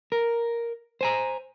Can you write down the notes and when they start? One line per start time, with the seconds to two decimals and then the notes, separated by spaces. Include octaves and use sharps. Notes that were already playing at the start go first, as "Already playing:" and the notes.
0.12 A#4
1.01 C5 G#5 A#5